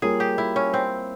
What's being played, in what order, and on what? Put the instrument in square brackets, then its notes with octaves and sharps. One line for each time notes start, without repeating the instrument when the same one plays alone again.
[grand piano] G3 A#3 F4 A#4 C#5 [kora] G#4
[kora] G4
E4
C#4
C4